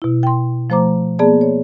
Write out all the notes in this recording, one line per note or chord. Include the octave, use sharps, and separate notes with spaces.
B2 E4
G5 C6
F3 A3 C5 A#5 D6
A#3 B3 G#4 D5 A5
C#5